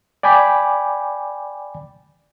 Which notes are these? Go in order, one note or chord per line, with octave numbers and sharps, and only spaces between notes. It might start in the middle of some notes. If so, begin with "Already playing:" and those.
D5 G5 G#5 B5 D6